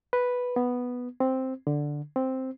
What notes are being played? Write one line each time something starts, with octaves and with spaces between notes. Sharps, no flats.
B4
B3
C4
D3
C4